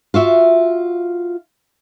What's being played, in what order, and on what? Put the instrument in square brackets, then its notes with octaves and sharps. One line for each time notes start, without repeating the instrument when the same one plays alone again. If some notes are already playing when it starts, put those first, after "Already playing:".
[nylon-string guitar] F4 F#4 E5 F5